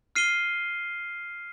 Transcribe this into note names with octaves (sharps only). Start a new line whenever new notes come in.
F6 C7 D#7 G7